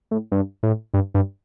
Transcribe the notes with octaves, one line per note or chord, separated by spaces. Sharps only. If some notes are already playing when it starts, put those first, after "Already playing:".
A2
G2
A2
G2
G2